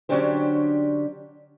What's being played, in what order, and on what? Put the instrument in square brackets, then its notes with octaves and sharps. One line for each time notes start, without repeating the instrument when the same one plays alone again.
[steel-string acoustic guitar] D3 F#3 C#4 D4 G4 C5